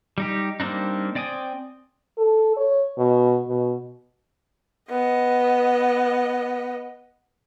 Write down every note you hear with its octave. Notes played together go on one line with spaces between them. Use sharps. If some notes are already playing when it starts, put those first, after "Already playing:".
G3 D#4 G4
G3 A#3 C4 D4 D#4
C4 D5 G5 G#5 D#6
A4
C#5
B2
B2
B3 D#5